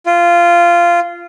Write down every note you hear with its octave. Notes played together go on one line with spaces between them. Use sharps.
F4